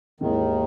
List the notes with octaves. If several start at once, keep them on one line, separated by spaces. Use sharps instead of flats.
D#2 G#2 D#3 E3 G#3 B3 E4